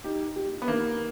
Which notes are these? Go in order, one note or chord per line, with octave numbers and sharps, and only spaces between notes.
D#4 G4
G4
B3
D#3 A#3